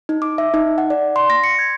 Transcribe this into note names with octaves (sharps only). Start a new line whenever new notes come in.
D#4
D6
E5
D#4
F#5
D5
C6
A#6
C#7
G#6